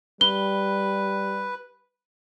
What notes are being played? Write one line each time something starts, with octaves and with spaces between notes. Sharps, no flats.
G3 B4 G7